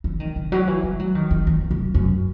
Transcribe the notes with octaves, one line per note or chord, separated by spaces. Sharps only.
E3
D#3
D#3
F#3
E3
G3
F#3
D#3
D#3
E2
F#2
F#2